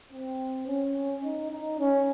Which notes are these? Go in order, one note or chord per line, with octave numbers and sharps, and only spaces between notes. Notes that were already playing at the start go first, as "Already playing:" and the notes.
C4
C#4
D#4
D#4
C#4